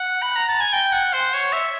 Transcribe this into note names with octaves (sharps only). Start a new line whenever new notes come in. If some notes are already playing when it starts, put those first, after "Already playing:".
Already playing: F#5
B5
A#5
A5
G#5
G5
F#5
C5
C#5
E5